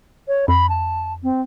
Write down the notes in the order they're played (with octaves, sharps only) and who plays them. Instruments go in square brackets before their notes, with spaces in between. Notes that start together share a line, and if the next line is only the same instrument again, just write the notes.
[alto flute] C#5
[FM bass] F2 [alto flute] B5
[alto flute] A5
C4